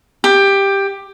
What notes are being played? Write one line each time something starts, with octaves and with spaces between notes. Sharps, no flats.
G4